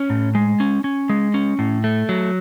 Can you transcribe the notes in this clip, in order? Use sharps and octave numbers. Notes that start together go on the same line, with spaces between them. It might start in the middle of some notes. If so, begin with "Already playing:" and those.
Already playing: C#4
A2
G#3
C#4
C#4
G#3
C#4
A2
A3
F#3